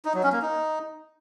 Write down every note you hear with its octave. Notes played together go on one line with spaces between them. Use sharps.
D#4
F#3
C#4
A#3
D#4